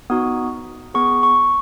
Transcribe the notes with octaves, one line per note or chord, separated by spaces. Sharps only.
B3 D#4 F#4 D#6
B3 G#4 C#6
C#6